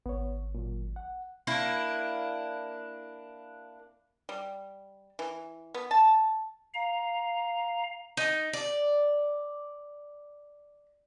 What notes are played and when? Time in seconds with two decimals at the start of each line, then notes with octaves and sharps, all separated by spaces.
0.06 G#1 B3 C#5
0.54 A#2 F#3
0.96 F#5
1.47 A#3 D4 E4
4.29 G3
5.19 E3
5.74 B3
5.91 A5
6.74 F5 A#5
8.17 D#4
8.53 D5